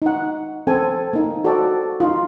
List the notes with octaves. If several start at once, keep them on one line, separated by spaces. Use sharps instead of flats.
D#4 F#5
C4 A4 G#5
A#3 D#4
F#4 A4 C5 D5 G5
D#4 F4